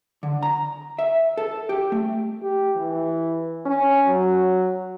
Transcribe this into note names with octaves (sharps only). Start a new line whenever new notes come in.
D3
A#5
E5
A4
G4
A3
G4
E3
C#4
F#3